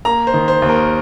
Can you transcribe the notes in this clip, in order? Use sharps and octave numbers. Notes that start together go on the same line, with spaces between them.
A#3 A#5
C5
D#3
C5
D#2
A#4